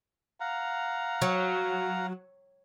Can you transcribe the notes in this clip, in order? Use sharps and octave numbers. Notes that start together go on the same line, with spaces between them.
F5 F#5 A#5
F#3